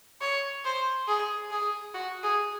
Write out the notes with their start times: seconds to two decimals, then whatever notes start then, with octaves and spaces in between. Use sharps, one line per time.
0.21 C#5
0.65 C5
1.08 G#4
1.51 G#4
1.94 F#4
2.23 G#4